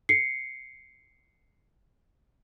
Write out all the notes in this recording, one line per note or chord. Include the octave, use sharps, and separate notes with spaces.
C7 C#7